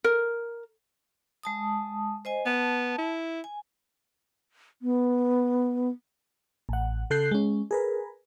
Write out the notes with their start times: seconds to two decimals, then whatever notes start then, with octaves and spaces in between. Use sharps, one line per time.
0.04 A#4
1.43 G#3 A5 D#6
2.25 C5 D#5 G#5
2.46 B3 A5
2.98 E4
3.44 G#5
4.81 B3
6.69 A1 F#5
7.10 C#3 A4 F#6 G6 C7
7.31 G#3 C#4
7.71 G#4 A#4 B4